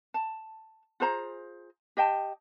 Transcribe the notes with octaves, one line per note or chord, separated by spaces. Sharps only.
A5
F4 G#4 C5 A#5
G4 D#5 G5 A5